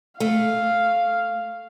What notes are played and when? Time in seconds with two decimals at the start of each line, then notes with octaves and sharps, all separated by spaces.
0.20 A3 F5